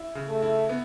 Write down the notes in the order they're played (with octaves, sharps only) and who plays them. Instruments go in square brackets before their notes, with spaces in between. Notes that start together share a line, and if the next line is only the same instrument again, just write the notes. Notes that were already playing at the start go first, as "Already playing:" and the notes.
Already playing: [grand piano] E4
C#3
[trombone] A3
[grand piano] E4
B3